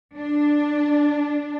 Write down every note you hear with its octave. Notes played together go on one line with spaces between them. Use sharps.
D4